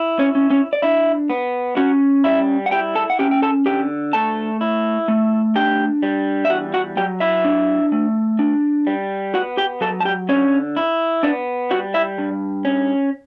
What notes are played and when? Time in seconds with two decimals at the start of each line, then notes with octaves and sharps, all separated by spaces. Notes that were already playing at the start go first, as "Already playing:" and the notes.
Already playing: E4
0.19 C#4 C#5
0.35 C#4
0.50 C#4 C#5
0.73 D5
0.82 D4 E4 E5
1.30 B3
1.77 C#4 F#4 F#5
2.24 G3 E4 E5
2.66 F#5
2.71 E4 G4 G5
2.95 A4 A5
3.10 F#5
3.19 C#4 G4 G5
3.31 G5
3.42 A4 A5
3.66 D3 G4 G5
4.13 A3 A4 A5
4.61 E4
5.08 A3
5.55 D4 G4 G5
6.02 G3
6.45 E5
6.50 E2 F#4 F#5
6.74 F#4 F#5
6.97 F#3 G4 G5
7.20 E4 E5
7.44 D4
7.92 A3
8.39 D4
8.87 G3
9.34 B3 F#4 F#5
9.57 G4 G5
9.81 F#3 A4 A5
10.00 A5
10.05 G4 G5
10.29 D3 C#4 C#5
10.76 E4
11.23 B3 D4 D5
11.71 G3 F#4 F#5
11.94 E4 E5
12.18 G2
12.65 C#4